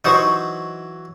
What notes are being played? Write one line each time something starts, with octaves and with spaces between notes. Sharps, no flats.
E3 F#3 D#4 C5 C#6